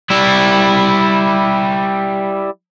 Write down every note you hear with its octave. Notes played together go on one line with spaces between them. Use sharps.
G3 E4